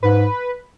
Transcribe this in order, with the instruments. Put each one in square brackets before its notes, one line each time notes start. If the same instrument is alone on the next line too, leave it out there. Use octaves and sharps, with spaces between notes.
[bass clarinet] G#2 [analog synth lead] B4